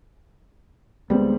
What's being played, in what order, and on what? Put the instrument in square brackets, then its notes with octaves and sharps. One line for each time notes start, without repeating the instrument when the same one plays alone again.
[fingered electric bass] D2 G#3 B3 [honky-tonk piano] G3 C4